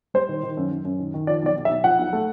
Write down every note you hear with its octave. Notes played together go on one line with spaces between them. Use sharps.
G3 C5
D#3
D#3
F#2
F#2
F#2
D#3
D#3
F3 D5
B1 D5
B1
E5
B1
F3 F#5
B1
A3